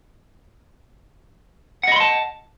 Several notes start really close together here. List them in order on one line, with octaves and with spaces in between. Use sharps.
F#5 D#5 B5 C6 A5